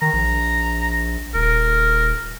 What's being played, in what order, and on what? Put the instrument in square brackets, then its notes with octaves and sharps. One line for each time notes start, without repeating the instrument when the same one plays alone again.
[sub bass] D#3 [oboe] A#5
[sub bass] A#1
[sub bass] D#1 [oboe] A#4